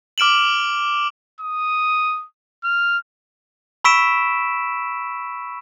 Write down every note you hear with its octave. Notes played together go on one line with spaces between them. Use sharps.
D6 F6 D7 E7 F#7
D#6
F6
B5 C#6 E6 B6 D7 E7